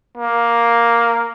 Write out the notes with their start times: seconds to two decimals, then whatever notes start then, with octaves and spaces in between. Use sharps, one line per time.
0.18 A#3